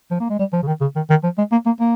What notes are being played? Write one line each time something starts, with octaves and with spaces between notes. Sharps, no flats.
F3
A#3
G#3
G3
F3
C#3
D#3
C#3
D#3
D#3
F3
G#3
A#3
A#3
A#3